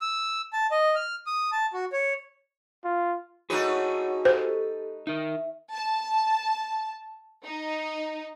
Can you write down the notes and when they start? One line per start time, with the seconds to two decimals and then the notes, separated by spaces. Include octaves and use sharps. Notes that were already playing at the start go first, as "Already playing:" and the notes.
0.01 E6
0.53 A5
0.71 D#5
0.95 F6
1.26 D#6
1.52 A5
1.73 F#4
1.93 C#5
2.84 F4
3.50 A3 D#4 F#4 G#4 B4 C#5 F#5
4.25 G4 A4 C5
5.07 D#4 A#4 E5
5.74 A5
7.45 D#4